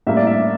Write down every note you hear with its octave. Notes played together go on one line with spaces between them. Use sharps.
A2 G3 A#3 E5
D5
E5